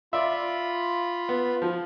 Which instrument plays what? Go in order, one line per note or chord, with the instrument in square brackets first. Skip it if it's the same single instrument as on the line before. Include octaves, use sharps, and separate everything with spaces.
[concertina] F4 B5 [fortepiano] D5 E5
[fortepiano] B3
F3